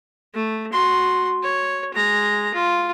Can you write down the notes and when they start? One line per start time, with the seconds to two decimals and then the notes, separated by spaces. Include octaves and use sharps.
0.34 A3
0.72 F#4 C6
1.43 C#5
1.94 G#3 A#5
2.54 F4